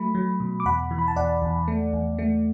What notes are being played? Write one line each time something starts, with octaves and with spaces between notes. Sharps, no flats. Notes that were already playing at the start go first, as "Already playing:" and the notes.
Already playing: F#3 A3 B5
F#3
B2
D6
E2 F#5 B5
E3
B5
A5
E2 D5 F#5
E2
A3
E2
A3